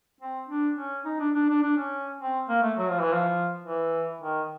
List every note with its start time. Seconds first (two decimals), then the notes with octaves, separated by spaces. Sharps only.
0.20 C4
0.48 D4
0.77 C#4
1.05 D#4
1.20 D4
1.35 D4
1.49 D4
1.63 D4
1.77 C#4
2.21 C4
2.49 A#3
2.63 A3
2.78 F#3
2.90 F3
3.02 E3
3.13 F3
3.64 E3
4.21 D#3